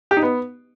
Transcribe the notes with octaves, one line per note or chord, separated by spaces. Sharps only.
G4
D#4
B3